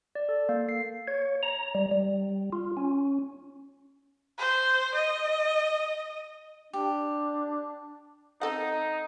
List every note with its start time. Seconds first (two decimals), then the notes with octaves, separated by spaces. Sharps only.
0.15 D5
0.29 A4
0.49 A#3
0.69 C7
1.08 C#5
1.43 A#5
1.75 G3
1.91 G3
2.53 F4
2.77 C#4
4.38 C5
4.95 D#5
6.73 D4 G4
8.41 C4 D#4 A4 F#5